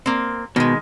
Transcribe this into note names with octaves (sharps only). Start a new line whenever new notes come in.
A#3 C4
B2 D#3 G#3